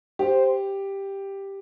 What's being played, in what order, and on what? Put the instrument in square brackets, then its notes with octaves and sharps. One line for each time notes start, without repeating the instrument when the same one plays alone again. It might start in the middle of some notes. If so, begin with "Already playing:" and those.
[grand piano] G4 [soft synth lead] C5